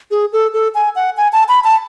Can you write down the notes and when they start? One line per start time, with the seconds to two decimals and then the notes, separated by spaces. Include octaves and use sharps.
0.11 G#4
0.33 A4
0.53 A4
0.75 G#5
0.96 F#5
1.17 G#5
1.33 A5
1.49 B5
1.64 A5